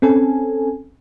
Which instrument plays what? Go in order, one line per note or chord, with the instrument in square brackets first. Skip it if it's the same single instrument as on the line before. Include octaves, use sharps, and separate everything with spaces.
[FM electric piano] C4 C#4 A4 G#5